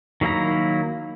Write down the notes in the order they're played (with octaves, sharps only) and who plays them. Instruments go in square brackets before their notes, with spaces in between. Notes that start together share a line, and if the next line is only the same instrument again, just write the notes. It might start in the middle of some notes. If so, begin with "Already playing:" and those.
[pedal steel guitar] D#3 F#3 A#3 E4 A#5